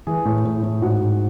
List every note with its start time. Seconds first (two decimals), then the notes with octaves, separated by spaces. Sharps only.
0.07 E3 G#4
0.25 A2
0.45 A2
0.63 A2
0.81 G#2 F#4
1.01 G#2